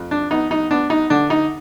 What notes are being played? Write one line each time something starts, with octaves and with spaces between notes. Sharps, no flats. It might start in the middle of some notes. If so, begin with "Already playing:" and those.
Already playing: F2
D4
B3 D#4
D#4
B3 D4
D#4
D3 D4
D#4